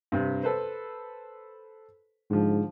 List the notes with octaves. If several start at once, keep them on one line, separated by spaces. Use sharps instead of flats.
G2 C3
A4 B4 C5
G#2 D3 F3